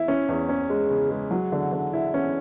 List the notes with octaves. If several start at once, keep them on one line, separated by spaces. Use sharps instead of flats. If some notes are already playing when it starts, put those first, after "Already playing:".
Already playing: E4
C#4
E2
C#4
G#3
C#3
G#3
F#3
D3
D3
E4
C#4